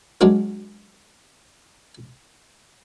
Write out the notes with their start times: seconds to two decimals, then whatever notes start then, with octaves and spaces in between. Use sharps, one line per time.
0.21 F#3 G#3 D4 F#4 G#4 A#4